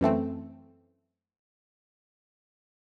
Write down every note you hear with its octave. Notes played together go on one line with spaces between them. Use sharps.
F#2 E3 A3 C4